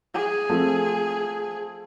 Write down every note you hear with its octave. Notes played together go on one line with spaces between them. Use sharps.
G#4
F3 A3 C4